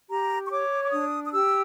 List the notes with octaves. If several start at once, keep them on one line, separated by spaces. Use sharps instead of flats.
G4 A#5
C#6
C#5 D6
D6
D4 D#6
D#6
G4 E6